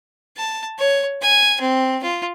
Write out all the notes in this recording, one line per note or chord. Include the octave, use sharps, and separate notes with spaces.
A5
C#5
G#5
C4
F4